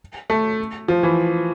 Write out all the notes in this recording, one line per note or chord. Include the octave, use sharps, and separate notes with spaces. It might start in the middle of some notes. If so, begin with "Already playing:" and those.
A3
F3
E3